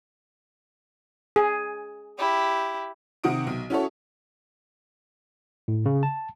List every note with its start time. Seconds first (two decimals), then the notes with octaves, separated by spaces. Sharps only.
1.36 G#4
2.19 E4 G4
3.24 C3 D#3 F#5 D#6 D7
3.47 B1
3.70 C#4 E4 F#4 A4 C#5
5.68 A2
5.86 C#3
6.03 A5